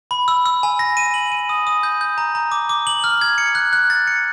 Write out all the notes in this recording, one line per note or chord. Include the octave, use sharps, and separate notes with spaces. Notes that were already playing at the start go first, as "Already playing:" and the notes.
B5
E6
E6
G#5
A#6
D#7
F#7
D#7
D#6
D#6
G6
G6
A#5
A#5
D6
D6
F#7
F6
G#6
C#7
F#6
F#6
A6
C#7